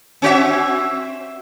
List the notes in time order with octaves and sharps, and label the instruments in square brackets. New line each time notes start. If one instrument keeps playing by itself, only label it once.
[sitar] C4 F#4 E5